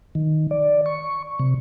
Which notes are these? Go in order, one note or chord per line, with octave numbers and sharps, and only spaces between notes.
D#3
D5
C#6
C3